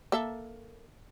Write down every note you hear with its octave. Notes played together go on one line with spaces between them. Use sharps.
A#3 A4 E5